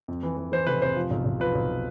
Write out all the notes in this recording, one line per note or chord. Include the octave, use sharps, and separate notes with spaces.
F2
E3
E3
E3 C5
F1 B4
F1 C5
F3
B1
B1
F3 B4
B1